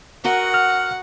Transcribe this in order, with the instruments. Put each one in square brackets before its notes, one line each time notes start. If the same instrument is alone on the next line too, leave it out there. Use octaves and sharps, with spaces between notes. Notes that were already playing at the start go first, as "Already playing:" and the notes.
[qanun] F#4 A#4 D#5 [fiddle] F#5
[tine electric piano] F6